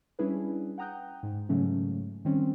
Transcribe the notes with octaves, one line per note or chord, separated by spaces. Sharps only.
G3 C#4 D4 E4 G#4 B4
F#5 G5 A#5 D#6 F#6 G6
G#2
G#2 C#3 F#3 A3 C#4
D#3 G3 C4 C#4